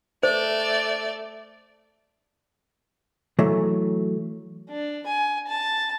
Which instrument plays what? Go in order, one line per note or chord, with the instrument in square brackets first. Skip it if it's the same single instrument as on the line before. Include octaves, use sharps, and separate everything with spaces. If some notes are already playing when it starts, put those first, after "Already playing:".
[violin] A3 D5 [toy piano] C5
[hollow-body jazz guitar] E3 F#3 A3
[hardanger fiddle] D4
G#5
A5